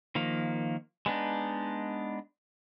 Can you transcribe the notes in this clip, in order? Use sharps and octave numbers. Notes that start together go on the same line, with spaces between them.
D#3 F3 A#3
G#3 B3 D4 D#4